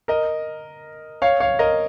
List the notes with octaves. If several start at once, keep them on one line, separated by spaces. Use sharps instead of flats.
A#4 D#5
C#5 F5
C#5 F5
A#4 D#5